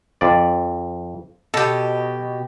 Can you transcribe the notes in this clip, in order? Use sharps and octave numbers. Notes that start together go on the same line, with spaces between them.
F2 D5
B2 G4 A4